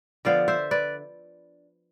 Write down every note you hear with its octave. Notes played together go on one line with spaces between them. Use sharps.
D3 F3 B3 D4 D5 F5
C5 E5
B4 D5